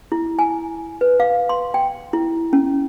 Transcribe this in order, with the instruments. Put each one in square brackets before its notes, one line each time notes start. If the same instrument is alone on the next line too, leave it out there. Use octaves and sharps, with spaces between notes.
[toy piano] E4
G#5
B4
F5
C6
G5
E4
C#4